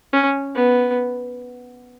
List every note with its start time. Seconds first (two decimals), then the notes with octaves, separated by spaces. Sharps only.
0.13 C#4
0.55 B3